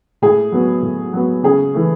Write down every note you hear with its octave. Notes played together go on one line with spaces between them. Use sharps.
A2 G#4
F#3 B3
A2
F#3 B3
C#3 G#4
E3 A3